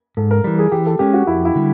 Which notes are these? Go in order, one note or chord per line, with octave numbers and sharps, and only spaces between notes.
G#2 A4
A#4
E3 G3
G#4
E3 G4
A4
G#3 C#4 G4
F#4
F2 E4
E4
D3 G3